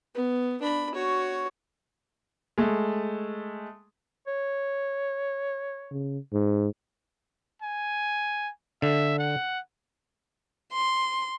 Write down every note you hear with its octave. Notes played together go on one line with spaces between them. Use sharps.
B3
D4 B5
F#4 C#5
G#3 A3
C#5
C#3
G#2
G#5
D3 E5
F#5
C6